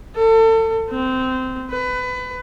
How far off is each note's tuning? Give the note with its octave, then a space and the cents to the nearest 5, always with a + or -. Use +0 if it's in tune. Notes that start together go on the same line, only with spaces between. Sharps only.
A4 +30
C4 -20
B4 +25